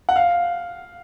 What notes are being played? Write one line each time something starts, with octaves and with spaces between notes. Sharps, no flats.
F#5
F5